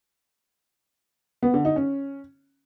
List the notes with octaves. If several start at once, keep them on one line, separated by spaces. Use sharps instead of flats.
B3
D3
D#4
C#4